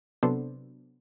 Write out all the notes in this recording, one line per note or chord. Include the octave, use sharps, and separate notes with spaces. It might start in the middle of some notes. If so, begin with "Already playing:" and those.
C3 F#3 B3 D4 A4 C5